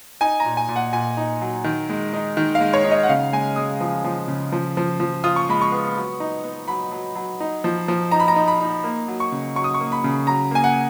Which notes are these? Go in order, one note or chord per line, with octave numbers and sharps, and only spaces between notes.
D#4 G#5
A#5
A#2
G#5
A#2
F#5
A#2 G#5
D#4
F#3
D#3
G#3
D#4
D#3
F5
G#3
C#5
D#4
D#5
F#5
C#3 F5
G#3 G#5
G#3 D#6
F3
F3
C#3
F3
F3
F3
F4 D#6
C#6
G#3 B5
C#6
B3
F#3
D#4
B3
F#3 B5
F#3
F#3
D#4
F3
F3
D#4 A#5
B5
A#5
D#4
B5
D#4
A#3
F#3
C#6
C#3
F#3 C#6
D#6
C#6
A#3
B5
C#3
F#3 A#5
A#3 G#5
F#5